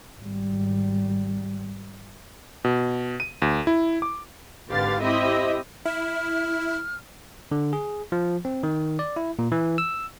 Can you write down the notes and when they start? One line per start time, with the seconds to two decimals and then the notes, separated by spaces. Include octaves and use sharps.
0.20 G#1 G3
2.64 B2
3.20 D#7
3.42 D2
3.67 E4
4.02 D6
4.69 G#1 D3 G4 B4 F5 A6
5.02 C4 E4 G4 D#5 E5
5.85 E4 F6
7.52 D3
7.73 G#4
8.12 F3
8.45 C4
8.63 D#3
8.99 D5
9.16 E4
9.39 A#2
9.52 E3
9.78 E6